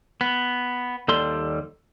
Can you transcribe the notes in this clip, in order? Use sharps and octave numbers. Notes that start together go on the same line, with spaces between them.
B3
D#2 G3 A4 D5 C6